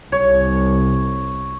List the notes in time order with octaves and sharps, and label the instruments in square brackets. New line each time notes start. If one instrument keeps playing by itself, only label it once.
[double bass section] C2 [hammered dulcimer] C#5